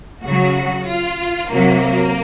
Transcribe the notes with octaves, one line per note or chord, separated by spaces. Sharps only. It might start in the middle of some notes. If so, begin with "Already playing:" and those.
C#3 F#3 F#4
F4
C3 F#3 A#3